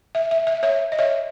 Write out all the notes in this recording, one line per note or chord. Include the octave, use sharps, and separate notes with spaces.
E5
E5
E5
C#5 E5
D#5
C#5 E5